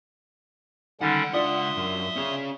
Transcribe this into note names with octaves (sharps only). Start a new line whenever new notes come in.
C#2 D3 D#3 G3 C#4 F#5
D4 F4 D5 E5 C6 D#6
F#2
C#4 G#4